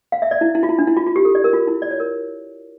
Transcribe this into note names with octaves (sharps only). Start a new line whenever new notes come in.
F5
E5
D5
E4
E4
F4
E4
D4
E4
F4
F4
G4
A4
D5
A#4
F4
E4
D5
C#5
A#4